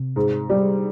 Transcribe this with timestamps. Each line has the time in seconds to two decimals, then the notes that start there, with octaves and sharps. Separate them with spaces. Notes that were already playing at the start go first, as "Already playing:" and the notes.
Already playing: C3
0.16 G#2
0.50 G3